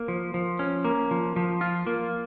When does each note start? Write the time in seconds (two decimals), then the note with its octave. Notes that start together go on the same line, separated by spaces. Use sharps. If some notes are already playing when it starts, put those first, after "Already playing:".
Already playing: A#3
0.08 F3
0.34 F3
0.59 C#4
0.84 A#3
1.11 F3
1.36 F3
1.61 F4
1.87 A#3